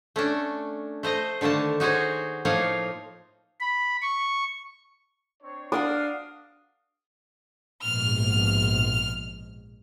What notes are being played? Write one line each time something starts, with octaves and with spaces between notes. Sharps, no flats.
A3 C#4 D4
A3 C5 D#5 A#5
D3 D#3 A3 A#3 A5
D#4 F#4 G#4 C5 C#5
A2 F3 A#3 D#4 C#5 F5
B5
C#6
C4 D4 C#5
D4 F#4 G#4 A#4 F5 D#6
A#1 G#2 B2 F6